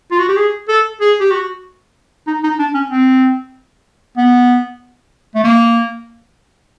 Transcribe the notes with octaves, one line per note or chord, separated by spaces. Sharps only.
F4
F#4
G4
G#4
A4
G#4
G4
F#4
D#4
D#4
D4
C#4
C4
B3
A3
A#3